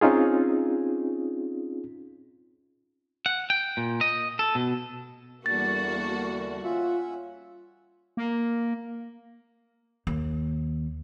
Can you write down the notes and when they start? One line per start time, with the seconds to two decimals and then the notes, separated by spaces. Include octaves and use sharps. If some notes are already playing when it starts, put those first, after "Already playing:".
0.01 C4 C#4 D#4 F4 G#4
3.26 F#5
3.50 G5
3.77 A#2
4.01 D#5
4.39 A4
4.55 B2
5.46 E2 D3 G3 A#3 F#4 A6
6.64 C#4 F4 E5 F#5
8.17 A#3
10.07 D#2